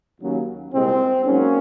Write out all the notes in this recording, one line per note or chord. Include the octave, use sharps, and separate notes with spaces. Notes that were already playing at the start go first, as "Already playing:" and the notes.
D#2 C#3 F#3
C2 A#2 G#3 C4
G#2 F#3 A#3 C#4